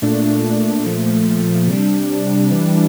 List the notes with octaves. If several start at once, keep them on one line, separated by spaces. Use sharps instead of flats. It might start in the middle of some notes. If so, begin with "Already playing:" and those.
A#2 A3 D4
A#2 F3 A3
C3 G3 D4
E3 G3 D4